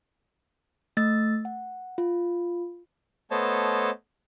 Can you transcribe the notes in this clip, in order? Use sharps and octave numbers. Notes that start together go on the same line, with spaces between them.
A3 E6 A6
F#5
F4
A3 B3 C5 C#5 D#5 A5